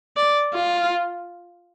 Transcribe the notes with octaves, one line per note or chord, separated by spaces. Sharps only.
D5
F4